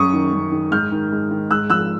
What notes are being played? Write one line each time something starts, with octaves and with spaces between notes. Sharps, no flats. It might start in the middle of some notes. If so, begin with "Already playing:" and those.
Already playing: F#2 C#6 D#6
D#3
F#2
D#3
G#2 F6 G6
D#3
G#2
D#3
G#2 E6 F#6
F3 E6 F#6